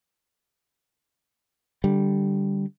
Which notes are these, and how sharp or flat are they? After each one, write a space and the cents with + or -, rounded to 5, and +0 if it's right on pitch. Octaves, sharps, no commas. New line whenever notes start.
D3 +0 G3 +0